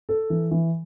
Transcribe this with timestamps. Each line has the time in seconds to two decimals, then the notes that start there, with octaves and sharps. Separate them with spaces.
0.09 A4
0.30 E3
0.51 E3